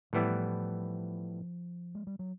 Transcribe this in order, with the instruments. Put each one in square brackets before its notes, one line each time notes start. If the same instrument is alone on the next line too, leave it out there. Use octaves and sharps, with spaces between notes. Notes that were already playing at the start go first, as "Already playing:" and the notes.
[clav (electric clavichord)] A2 E3 G3 B3 E4 [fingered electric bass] F3
[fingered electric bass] G#3
G3
F#3